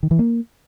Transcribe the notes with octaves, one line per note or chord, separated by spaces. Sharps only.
D#3
E3
A#3